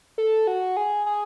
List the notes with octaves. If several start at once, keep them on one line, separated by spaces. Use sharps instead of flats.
A4
F#4
G#4
G#4